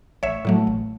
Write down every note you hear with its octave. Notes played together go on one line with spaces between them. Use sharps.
A1 C#5 E5
A2 F#3 A3
A1